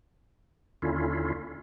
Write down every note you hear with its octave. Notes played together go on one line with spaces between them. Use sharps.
D#2 D3 C#4 E4 F4